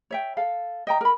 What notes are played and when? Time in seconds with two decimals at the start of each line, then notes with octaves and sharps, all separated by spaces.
0.11 C#5 E5 G5
0.37 A4 F5
0.87 D#5 G5 A#5
1.01 A#4 B5